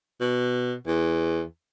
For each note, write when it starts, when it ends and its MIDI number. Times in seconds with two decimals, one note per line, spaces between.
0.20 0.75 47
0.87 1.42 40